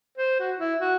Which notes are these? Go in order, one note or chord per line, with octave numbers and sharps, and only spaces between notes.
C5
F#4
E4
F#4